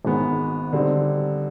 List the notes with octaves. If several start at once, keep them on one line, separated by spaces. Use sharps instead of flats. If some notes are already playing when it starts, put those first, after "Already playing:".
G#1 G#2 D#3 G#3 B3
D3 G3 C4 D#4